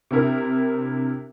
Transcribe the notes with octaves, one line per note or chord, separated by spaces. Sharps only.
C3 C4 D4 E4 A#4